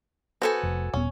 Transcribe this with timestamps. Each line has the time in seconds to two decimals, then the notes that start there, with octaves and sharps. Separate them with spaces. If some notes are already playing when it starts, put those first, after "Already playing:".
0.42 B3 F#4 A4 C5 G#5
0.63 F1
0.94 D#1 B3 C#4